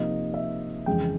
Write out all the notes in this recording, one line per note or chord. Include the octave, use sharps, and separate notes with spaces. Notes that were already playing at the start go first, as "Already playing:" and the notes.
Already playing: C3 F3 A#3 D#4 D#5
E5
F2 C#3 E3 G#3 G5